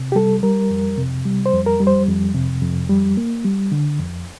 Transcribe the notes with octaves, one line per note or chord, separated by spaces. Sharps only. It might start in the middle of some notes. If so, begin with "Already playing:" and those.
Already playing: C3
G4
G3 A4
G3 A#4
F2
C3
G3
C5
F2
A#4
G3
C5
F2
C3
F2
G3
A#3
G3
D3
F2